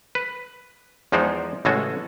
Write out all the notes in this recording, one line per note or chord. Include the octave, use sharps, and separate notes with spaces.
B4
E2 F3 G#3 D#4 C5 D5
A1 C#3 G#3 F#4 A4 G#5